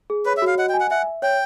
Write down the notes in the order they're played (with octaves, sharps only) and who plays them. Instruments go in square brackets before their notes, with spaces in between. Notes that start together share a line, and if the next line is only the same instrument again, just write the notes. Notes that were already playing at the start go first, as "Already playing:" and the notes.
[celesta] G#4
[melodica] B4 [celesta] C#5
[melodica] E5
[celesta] F#4
[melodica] F5
[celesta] D#5 [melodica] F#5
[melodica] G5
[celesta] G#5
[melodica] F#5
[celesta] E5 [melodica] F#5
[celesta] E5
[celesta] C#5 [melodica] G5